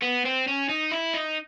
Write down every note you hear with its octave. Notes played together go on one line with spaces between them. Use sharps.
B3
C4
C#4
D#4
E4
D#4